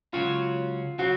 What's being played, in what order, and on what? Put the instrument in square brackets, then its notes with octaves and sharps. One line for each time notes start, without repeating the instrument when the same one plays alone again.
[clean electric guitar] C#2 C#3 F#3 C#4 F#4 [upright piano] F4
[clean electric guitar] C#3 F#3 C4 [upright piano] F#4